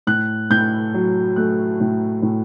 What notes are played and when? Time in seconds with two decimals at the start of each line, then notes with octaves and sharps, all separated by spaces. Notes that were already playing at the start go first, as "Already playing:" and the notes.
0.07 A2 F#6
0.50 A2 G6
0.94 F#3
1.36 A3 F#6
1.80 A2
2.22 A2